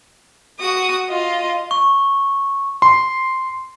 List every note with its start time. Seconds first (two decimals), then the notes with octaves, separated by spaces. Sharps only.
0.60 F#4 D#6
1.09 F4 D#5
1.71 C#6
2.82 C6